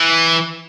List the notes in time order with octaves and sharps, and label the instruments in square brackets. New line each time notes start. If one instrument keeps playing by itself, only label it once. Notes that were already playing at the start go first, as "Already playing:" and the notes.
Already playing: [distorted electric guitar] E3